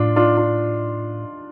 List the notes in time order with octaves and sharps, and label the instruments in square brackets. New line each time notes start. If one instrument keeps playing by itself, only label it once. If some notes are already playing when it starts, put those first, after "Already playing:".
Already playing: [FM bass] A2 [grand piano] D4 F4
[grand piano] D4 F4
D4 F4